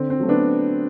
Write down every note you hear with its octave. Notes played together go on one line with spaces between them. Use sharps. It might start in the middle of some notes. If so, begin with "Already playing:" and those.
Already playing: D3 C4
C4
F#3 A3
B3 D4